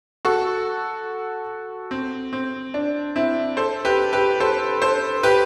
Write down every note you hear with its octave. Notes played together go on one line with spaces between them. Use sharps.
F#4 A4
C4
C4
D4
C4 E4
A4 C5
G4 B4
G4 B4
A4 C5
A4 C5
G4 B4